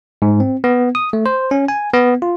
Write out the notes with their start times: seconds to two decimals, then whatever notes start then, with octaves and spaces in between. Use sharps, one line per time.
0.22 G#2
0.40 C4
0.64 B3
0.95 D#6
1.13 A3
1.26 C5
1.51 C#4
1.68 G#5
1.94 B3
2.22 F4